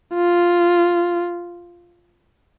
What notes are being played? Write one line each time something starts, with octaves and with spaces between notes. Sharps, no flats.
F4